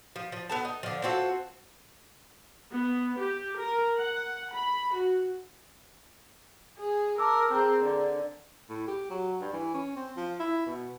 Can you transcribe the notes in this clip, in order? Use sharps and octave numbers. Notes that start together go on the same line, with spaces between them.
F3
F3
B3 A4 A5
D#4
D3 F3
C4 F4 F#4 A4
B3
G4
A#4
F#5
B5
F#4
G#4
A#4 A5 D6 E6
C4 G#4 A#5
D3
A2
G4
F#3
G2
E3
C#4
C4
F3
E4
B2